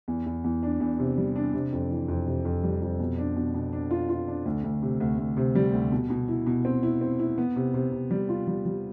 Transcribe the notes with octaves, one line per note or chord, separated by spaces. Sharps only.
E2
E2
E2
D4
E2
C3
G3
D4
C3
F2
E3
F2
C3
F2
G3
F2
B2
D4
B2
B2
D4
F4
F4
D4
D2
D2
C3
D2
D2
C3
G3
D2
B2
B2
E4
B2
C4
E4
C4
E4
B3
C3
C3
C3
G3
F4
G3
G3